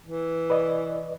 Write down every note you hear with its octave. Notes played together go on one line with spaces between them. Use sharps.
E3
B4 D5 D#5